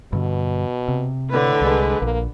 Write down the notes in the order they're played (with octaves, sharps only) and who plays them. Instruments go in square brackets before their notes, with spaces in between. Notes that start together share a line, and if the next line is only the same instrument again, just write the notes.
[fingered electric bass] G2 D3 [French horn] B2
[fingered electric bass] C3
[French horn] A2 [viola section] D3 B4
[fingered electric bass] C2 [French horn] G#3
[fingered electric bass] A#1 [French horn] A#3